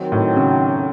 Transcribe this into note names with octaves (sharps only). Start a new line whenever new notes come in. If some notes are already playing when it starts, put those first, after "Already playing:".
Already playing: D#3 F#3 C4
A2
C#3